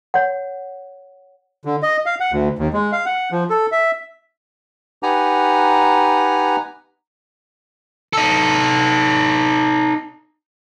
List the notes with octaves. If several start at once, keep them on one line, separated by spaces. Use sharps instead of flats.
C#5 F#5
D3
D#5
F5
F#5
D2
D#2
G#3
F5
F#5
F3
A4
E5
D#4 G4 B4 F#5 G#5 A#5
D#4 A4